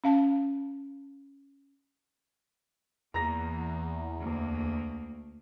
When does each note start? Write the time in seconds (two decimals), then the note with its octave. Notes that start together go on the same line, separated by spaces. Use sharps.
0.04 C#4 F5 A5
3.14 E2 A#3 A#5 A#6
4.21 D2 A#3